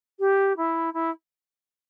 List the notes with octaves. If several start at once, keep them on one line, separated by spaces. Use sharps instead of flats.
G4
E4
E4